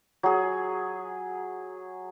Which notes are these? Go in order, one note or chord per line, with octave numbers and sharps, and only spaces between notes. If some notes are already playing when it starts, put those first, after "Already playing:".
F#3 G#4